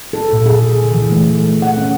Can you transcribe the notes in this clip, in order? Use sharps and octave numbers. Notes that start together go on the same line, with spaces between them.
A4
A#2
G#4
D3
E3
A3
A3
F#5
C#4